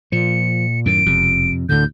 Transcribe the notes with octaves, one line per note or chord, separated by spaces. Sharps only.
A#2 F3 C#7
F#2 A2 D#3 D7
E1 F2 C3
D2 A2 D3 G6